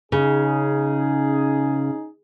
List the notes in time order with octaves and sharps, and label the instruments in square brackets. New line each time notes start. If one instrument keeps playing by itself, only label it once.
[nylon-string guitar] C#3 [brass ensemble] C#4 D#4 G#4